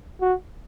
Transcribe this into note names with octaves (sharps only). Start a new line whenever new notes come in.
F#4